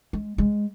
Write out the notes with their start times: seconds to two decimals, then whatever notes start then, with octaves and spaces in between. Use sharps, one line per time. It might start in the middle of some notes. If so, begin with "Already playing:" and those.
0.13 G#3
0.38 G#3